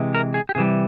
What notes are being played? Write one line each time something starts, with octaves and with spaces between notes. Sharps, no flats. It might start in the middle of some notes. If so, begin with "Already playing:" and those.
Already playing: C3 E3 G#3
A#4
G#4
G4
C3 E3 G3 G#4